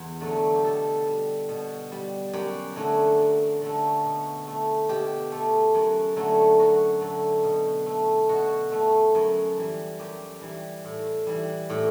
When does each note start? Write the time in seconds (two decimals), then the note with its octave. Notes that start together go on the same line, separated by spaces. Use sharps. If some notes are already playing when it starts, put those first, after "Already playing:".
Already playing: E2
0.21 D3 F#3 A3
0.56 G4
0.64 B2 A4
1.07 G3
1.49 B2
1.92 G3
2.33 F#2 G4
2.76 D3 F#3 A3
3.18 F#2
3.61 D3 F#3 A3
4.04 B2
4.47 A3
4.89 B2 G4
5.32 A3
5.74 F#2
6.16 D3 F#3 A3
6.59 F#2 F#4
7.01 D3 F#3 A3
7.44 B2
7.86 A3
8.29 B2 F#4
8.72 A3
9.15 F#2
9.57 E3 G3
9.99 F#2 G4
10.41 E3 G3
10.85 A2
11.27 E3 G3
11.70 A2 G4